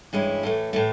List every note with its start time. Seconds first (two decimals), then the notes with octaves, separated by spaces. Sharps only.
0.13 G2 E3 G#3 C#4 E4
0.43 A2 E3 A3
0.73 A2 E3 A3